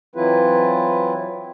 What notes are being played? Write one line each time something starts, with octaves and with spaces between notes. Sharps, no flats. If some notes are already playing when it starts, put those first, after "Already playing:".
E3 F#3 C4 E4 F4 B4